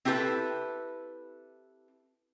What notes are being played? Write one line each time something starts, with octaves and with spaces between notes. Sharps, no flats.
C4 E4 G4 A4 B4